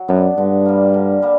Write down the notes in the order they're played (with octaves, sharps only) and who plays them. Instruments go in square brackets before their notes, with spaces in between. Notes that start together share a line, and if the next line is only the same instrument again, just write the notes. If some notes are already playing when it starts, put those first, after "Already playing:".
Already playing: [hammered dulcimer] F#3
[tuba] F#2 [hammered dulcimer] B3 D4
[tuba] G2 [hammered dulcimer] D3
[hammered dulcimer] G3 A#3
D3
G3 A#3